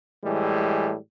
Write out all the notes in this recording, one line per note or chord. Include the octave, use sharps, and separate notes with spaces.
A2 E3 G3 G#3